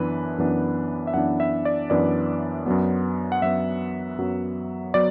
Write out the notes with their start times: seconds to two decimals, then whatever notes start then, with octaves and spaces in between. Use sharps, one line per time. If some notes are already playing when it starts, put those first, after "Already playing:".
Already playing: F#2 E3 B3 D4 B4
0.38 F#2 E3 B3 D4
1.07 E5
1.14 F#2 E3 B3 D4 F#5
1.40 E5
1.65 D5
1.90 F#2 E3 B3 D4 D5
2.66 F#2 F#3 B3
3.32 F#5
3.42 F#2 F#3 B3 E5
4.18 F#2 F#3 B3
4.94 F#3 B3 D5